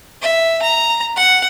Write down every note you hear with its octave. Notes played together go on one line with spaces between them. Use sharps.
E5
A#5
F#5